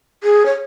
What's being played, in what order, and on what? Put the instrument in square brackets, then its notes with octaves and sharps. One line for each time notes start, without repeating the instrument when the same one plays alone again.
[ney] G#4
C#5